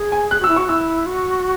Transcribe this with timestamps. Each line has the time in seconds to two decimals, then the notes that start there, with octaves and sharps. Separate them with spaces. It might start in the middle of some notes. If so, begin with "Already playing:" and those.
Already playing: G#4
0.12 G#5
0.31 G#4 F#6
0.40 F#4 E6
0.48 E4
0.56 F#4 C#6
0.69 E4 E6
1.06 F#4